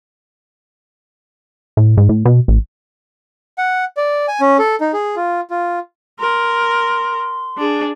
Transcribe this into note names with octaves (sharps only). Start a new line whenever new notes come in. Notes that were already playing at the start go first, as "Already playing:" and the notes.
A2
G#2
A2
B2
A1
F#5
D5
G#5
C#4
A4
D#4
G#4
F4
F4
A#4 C6
D4 G#4